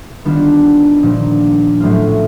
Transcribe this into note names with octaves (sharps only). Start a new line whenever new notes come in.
D#3 G3 B3 D4 F4
A#2 F3 A#3 D4
A2 F#3 A3 C#4 F4